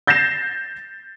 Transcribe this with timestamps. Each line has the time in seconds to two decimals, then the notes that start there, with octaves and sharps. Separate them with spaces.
0.07 G6 A6 A#6 C7 E7